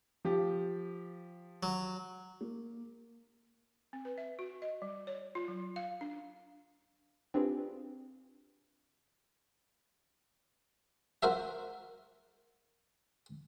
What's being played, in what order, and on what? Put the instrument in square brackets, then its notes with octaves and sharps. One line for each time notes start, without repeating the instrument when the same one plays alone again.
[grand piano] F3 G4
[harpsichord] F#3
[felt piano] A#3
[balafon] C4
B4
E5
F#4
D#5
G3
C#5
F4
F#3
F5
D4
[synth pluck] C4 D4 F4 G4 G#4 B4
[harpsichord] F#4 A#4 C5 E5